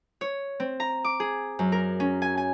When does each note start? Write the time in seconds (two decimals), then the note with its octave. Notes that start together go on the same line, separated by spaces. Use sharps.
0.21 C#5
0.60 C4
0.80 A#5
1.04 D6
1.20 G#4
1.59 F#2
1.72 A#4
2.00 C#4
2.22 G#5
2.37 G#5